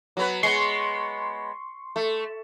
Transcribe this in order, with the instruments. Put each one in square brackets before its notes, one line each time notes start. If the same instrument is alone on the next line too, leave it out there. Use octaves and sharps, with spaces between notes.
[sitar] F#3 B3 B4
[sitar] G#3 B3 [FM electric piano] C6 C#6
[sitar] A3